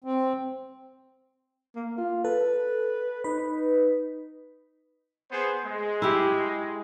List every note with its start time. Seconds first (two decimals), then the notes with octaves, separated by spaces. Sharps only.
0.04 C4
1.75 A#3
1.98 F4
2.25 A4 B4
3.24 D#4 B4
5.32 B3 G#4 C5
5.65 G#3
6.02 E4 G4